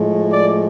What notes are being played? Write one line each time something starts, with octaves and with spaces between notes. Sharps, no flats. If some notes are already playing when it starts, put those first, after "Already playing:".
Already playing: A2 F3 G#3
D5